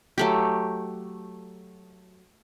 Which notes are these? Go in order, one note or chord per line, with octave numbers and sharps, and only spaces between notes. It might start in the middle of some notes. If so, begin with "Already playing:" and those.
F#3 A3 G4